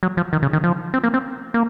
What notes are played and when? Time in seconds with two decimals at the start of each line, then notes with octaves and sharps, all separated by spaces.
0.03 F#3
0.17 F3
0.33 D#3
0.43 C#3
0.53 D#3
0.64 F3
0.94 C4
1.04 A#3
1.14 C4
1.54 A#3